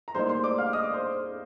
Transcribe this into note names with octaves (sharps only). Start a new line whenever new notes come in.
A#5
A2 G3 A#3 D#4 C5 C6
C5 C6
D5 D6
F5 F6
D#5 D#6
D5 D6
C5 C6